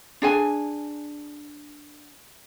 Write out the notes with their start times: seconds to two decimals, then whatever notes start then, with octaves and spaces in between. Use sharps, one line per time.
0.22 D4 G#4 G#5